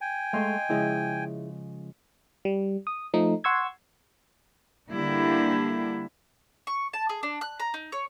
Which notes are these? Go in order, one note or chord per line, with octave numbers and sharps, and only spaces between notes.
G5 G#5
G#3 A3 D#5 F5 C6
C#3 F3 G#3 E4 G#4 D#5
G3
D#6
F3 A3 D#4
F#5 C6 C#6 E6 G#6
D3 G3 A#3 D4 E4 G4
C#6
A5
G#4
D4
F#6
A#5
D#4
C#5